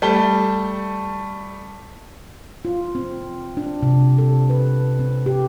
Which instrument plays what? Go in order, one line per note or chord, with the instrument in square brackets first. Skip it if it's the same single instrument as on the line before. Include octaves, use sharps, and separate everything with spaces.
[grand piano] G3 A3 A5 G7
[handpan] F4
C4
D4
C3
A4
B4
C4
G4